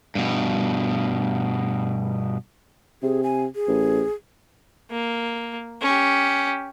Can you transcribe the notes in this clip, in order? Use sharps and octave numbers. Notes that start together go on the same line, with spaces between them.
G2 B2
C3 G#4
G#5
G#4
A1
A#3
C#4 G4